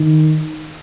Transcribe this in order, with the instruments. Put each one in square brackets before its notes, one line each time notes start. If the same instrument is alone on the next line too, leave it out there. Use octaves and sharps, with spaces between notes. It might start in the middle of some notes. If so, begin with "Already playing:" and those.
Already playing: [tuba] D#3